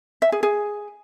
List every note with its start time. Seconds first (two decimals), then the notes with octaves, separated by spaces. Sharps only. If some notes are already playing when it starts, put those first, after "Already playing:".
0.22 E5
0.32 G#4
0.43 G#4